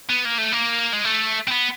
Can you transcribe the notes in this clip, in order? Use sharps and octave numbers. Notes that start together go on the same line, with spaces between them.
B3
A#3
A3
A#3
G#3
A3
C4
B3